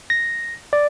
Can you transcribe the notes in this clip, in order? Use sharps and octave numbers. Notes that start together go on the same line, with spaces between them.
A#6
D5